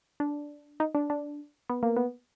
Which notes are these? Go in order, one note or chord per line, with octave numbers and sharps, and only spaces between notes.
D4
D#4
D4
D4
B3
A#3
B3